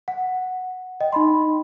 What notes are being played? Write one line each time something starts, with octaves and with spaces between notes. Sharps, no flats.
F#5
D#5 G5
D#4 D#5 B5 C6